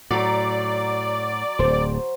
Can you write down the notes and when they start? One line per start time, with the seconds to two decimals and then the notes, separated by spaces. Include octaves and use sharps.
0.11 A2 F#3 D5 A#5
1.59 D1 C5